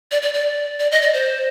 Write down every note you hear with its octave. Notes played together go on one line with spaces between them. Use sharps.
D5
D5
D5
D5
D#5
D5
C5